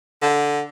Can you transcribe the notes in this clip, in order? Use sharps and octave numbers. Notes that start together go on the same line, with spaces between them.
D3